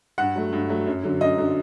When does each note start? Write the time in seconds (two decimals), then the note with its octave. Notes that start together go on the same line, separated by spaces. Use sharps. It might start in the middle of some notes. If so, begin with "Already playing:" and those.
0.18 G2 F#5
0.35 F#3 A3
0.53 G2
0.69 F#3 A3
0.87 F#2
1.04 D3 F#3
1.21 F#2 D#5
1.38 D3 F#3